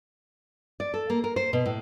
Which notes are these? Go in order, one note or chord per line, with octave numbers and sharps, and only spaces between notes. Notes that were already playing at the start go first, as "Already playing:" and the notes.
D5
A4
A#3
A#4
C5
B2
A2